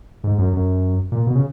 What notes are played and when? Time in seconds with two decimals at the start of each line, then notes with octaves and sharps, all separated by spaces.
0.24 G#2
0.39 F#2
0.54 F#2
1.12 A#2
1.27 B2
1.35 C#3